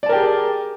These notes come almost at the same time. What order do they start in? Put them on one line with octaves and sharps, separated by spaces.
D5 A5 A#4 G4 G#4